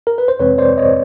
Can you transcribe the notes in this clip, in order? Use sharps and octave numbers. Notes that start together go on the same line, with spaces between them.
A#4
B4
C5
F2 C3 E3 G#3 C4 B4 C#5
C5 D5
C#5 D#5